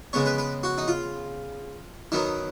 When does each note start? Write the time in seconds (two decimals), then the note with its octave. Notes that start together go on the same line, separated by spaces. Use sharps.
0.13 C#3 G#3 B3 C#5
0.26 B4
0.38 B4
0.63 F#4
0.78 D#4
0.88 F4
2.12 D#3 F#3 B3 D#4